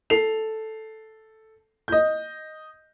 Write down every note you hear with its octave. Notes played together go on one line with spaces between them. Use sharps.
A4 C7 F7
D#5 G6